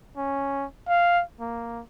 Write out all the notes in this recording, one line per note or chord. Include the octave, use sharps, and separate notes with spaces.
C#4
F5
A#3